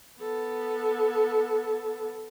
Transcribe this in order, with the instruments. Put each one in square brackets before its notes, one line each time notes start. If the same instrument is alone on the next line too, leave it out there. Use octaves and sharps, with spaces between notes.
[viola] B3 A4